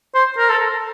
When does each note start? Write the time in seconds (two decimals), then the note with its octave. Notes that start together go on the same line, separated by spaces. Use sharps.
0.15 C5
0.38 A#4
0.49 A4